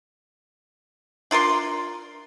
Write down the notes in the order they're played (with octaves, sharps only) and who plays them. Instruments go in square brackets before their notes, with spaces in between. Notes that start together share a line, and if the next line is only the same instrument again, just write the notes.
[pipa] D4 F4 A#4 C6